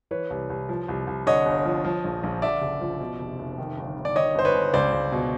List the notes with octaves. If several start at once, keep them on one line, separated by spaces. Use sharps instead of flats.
E3 B4 C#5
C2
C2
F3
C2
C2
D3 C#5 D#5
G1
F3
F3
A#1
A#1
D3 D5 E5
F#1
F3
B2
F1
F1
D#3
G1
G1
D5
D#3 C#5 D#5
G1 C5
B4 C#5
G1
C#2 C5 D5
C#2
B2